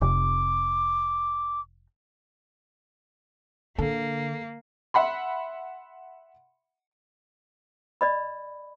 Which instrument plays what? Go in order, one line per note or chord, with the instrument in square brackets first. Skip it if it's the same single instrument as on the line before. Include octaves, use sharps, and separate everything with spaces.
[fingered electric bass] F1 C3 [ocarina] D6
[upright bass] D3 [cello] A#3 [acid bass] A4
[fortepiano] E5 F#5 B5 C6
[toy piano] D5 D#5 B5